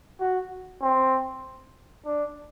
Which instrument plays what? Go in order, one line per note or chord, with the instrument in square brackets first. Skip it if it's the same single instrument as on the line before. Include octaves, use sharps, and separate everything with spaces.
[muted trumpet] F#4
C4
D4